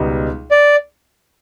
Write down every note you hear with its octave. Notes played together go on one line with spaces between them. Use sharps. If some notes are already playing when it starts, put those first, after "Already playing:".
Already playing: C#2 B2 G3 B3 D#4
D5